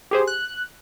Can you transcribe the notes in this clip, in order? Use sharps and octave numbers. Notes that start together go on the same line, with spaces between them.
G4 G#4 C5
F#6